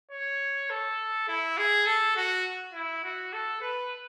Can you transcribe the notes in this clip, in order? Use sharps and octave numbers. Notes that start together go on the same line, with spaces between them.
C#5
A4
E4
G#4
A4
F#4
E4
F#4
A4
B4